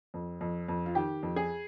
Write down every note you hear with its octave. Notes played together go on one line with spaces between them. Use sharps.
F2
F2
F2
F4
D#3 G4
F2
G#4